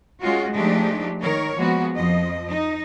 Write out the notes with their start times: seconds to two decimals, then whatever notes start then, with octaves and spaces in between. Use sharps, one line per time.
0.23 G#3 C#4 F4 F#4
0.54 F3 G#3 A3 D4 D#4 G4
1.23 D#3 A#4 C#5
1.57 F3 G#3 A#3 B3 F#4
1.95 F2 F3 D#5
2.49 D#4